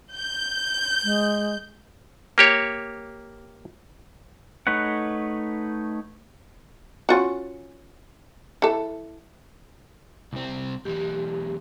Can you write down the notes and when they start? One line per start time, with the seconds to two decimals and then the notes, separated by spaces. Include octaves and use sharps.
0.13 G6
1.04 G#3
2.38 A#3 G4 C#5
4.67 A3 D#4 B4 C#5 F#5
7.09 C#4 F4 F#4
8.62 E3 A4
10.33 C2 C4
10.85 B1 E3 G4